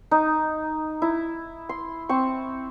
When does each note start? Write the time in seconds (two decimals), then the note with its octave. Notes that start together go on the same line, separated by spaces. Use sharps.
0.11 D#4
1.02 E4
1.69 C6
2.09 C4 C#6